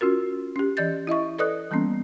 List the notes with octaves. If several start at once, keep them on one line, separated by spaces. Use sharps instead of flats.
C#4 F4 F#4 A#4
C#4 G4
E3 D5 D#5 G6 A6
E4 D#5 E5 C#6
A4 B4 D5 D#5 D#6 F#6
E3 G3 A#3 B3 C#4